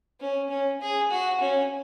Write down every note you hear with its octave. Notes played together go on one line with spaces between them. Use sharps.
C#4
C#4
G#4
F#4
C#4